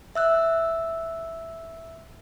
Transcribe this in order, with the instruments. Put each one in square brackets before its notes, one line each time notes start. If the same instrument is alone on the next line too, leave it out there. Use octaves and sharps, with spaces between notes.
[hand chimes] E5 E6 F#6